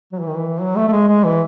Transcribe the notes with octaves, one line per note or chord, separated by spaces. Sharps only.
F#3
E3
D#3
E3
F#3
A3
A3
G#3
G#3
E3